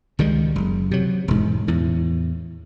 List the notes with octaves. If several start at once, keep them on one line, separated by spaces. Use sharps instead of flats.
C#2 D#3 G3 G#3
F#1
C3 F#3
E1 G#2
E2 A2